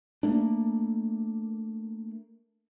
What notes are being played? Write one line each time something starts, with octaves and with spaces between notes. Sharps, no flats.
A3 A#3 D4